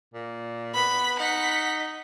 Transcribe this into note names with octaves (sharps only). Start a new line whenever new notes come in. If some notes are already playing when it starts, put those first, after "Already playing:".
A#2
B3 B5
D#4 F#5 B6